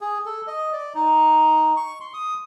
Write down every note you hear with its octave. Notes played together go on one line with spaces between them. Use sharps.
G#4
A4
D#5
D5
D#4
C#6
C6
D#6